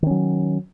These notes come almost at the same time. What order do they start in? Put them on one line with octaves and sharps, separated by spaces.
D#3 C#4 F#3